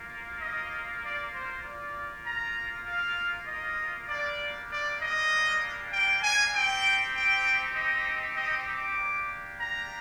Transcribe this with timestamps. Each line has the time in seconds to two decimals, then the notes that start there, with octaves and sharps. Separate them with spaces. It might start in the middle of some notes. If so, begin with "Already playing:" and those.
Already playing: A#3 F4
0.41 D#5
1.03 D5
1.34 C5
1.64 A#3 F4 D5
2.25 A#5
2.86 F5
3.47 D#5
4.08 G3 A#3 D4 D5
4.70 D5
4.99 D#5
5.91 G5
6.22 G#5
6.53 C4 D#4 G4 G5
7.14 G5
7.76 D#5
8.36 D#5
8.66 D6
8.97 A#3 D4 G4
9.59 A#5